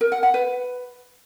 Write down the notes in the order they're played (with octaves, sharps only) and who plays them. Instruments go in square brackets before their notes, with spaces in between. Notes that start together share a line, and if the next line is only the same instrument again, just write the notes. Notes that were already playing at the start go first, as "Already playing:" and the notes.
[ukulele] A#4
F#5
F#5
B4